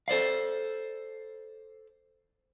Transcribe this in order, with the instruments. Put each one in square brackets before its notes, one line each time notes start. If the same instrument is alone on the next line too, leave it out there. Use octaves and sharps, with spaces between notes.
[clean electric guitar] A4 C5 D5 F5